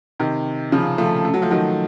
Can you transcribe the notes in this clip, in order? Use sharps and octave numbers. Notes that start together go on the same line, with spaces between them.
C3 D#3
C#3 F3
F3 A3
A3
F#3
F3 A3
D#3 F#3